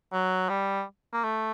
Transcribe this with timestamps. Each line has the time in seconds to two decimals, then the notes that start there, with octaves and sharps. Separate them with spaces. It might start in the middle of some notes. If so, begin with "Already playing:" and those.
0.13 F#3
0.49 G3
1.13 A#3
1.24 A3